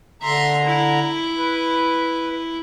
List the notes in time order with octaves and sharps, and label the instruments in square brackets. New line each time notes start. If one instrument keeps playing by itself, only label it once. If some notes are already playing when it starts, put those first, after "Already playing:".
[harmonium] D3 A#5 [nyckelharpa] E5 C6
[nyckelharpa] E4
[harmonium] B4